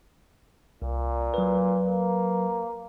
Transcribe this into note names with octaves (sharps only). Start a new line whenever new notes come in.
C2 A#2
F#3 B4
A#3